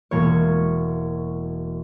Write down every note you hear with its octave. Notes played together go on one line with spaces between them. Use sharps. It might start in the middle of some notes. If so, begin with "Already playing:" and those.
E1 A#3 C#5